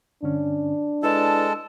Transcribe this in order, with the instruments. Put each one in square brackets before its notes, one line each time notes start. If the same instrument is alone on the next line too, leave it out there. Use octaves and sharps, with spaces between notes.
[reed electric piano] G2 D3 C#4 [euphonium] D4
[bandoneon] G#3 A4 [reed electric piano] E4 B4 D5 [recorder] A5